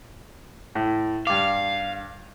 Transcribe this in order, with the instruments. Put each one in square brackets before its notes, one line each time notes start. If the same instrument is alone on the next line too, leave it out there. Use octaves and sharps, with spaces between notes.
[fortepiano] A2
[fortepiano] G2 D6 [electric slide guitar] F5